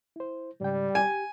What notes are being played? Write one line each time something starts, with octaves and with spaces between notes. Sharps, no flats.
E4 C5
G#2 C#3 G3 G5
G4 G#5